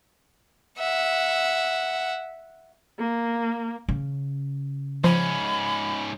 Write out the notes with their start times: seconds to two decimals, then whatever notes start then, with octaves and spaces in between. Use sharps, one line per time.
0.79 E5 F#5
2.99 A#3
3.89 C#3
5.04 G#2 F3 C#4 C5 B5